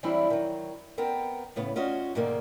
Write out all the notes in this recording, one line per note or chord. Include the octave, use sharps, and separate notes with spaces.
E3 F#3 G3 C4 D4 E4
D#3 F#3
B3 C4 A#4 G5
A2 C#3 B3
C#4 F4 F#4 D#5
G#2 B2 D3 D#3 G#3 A#3